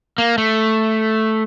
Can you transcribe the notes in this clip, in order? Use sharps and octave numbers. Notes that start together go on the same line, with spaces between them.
A#3
A3